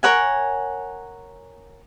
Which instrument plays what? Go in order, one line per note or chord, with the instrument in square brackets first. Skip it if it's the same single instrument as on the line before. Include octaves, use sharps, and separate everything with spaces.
[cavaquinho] A#4 C#5 F#5 G#5